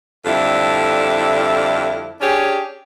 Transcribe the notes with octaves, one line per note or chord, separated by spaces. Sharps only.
F2 D3 G3 E4 A4
C#4 D4 G4 G#4 C#5